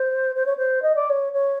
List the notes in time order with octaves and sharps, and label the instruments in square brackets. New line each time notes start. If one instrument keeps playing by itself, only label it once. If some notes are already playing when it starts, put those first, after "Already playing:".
Already playing: [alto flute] C5
C5
C#5
C5
D#5
D5
C#5
C#5